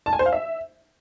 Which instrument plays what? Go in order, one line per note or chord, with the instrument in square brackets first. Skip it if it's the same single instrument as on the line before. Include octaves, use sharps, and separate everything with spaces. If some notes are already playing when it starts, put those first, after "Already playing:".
[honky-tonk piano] A5
G#5
C5
F5
E5